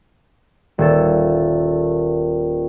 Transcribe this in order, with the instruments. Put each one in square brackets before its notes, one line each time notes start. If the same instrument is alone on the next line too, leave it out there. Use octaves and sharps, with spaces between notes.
[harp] D#1 A4